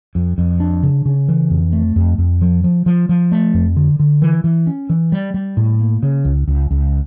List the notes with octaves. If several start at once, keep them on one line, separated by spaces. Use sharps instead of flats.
F2
F2
D4
C#3
C#3
E3
F2
A3
F2
F2
F3
F3
F3
F3
A3
F2
D3
D3
E3
E3
C#4
E3
G3
G3
A2
A#3
C#3
C#2
C#2
C#2